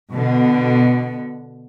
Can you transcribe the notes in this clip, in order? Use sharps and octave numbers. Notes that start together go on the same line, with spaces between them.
B2 D3